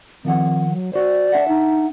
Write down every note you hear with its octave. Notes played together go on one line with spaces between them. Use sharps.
D#3 F3 C4 F#5
F#3
F#4 C5 D5
D4 E5 F#5
D#4